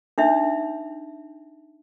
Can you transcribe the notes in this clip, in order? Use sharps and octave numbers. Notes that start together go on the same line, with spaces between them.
D4 D#4 E5